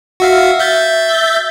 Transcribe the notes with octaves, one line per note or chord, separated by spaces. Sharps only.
F#4 E5 F5
E5 G6 A6